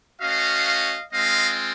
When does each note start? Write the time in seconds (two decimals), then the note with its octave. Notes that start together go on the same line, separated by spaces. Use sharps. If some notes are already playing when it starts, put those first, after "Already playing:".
0.21 A3 C#4 F#4 D#5 F5
1.13 G#3 C4 F4 D#5 F5